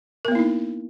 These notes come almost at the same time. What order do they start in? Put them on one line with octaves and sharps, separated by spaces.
A#4 B3 A#3 E4 D#4